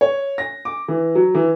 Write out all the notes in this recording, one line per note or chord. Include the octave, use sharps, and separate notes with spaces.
C#5
A#6
D6
E3
F#3
E3